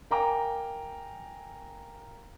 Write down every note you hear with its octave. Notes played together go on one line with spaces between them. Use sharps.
A#4 F5 G5 G#5 A#5 D6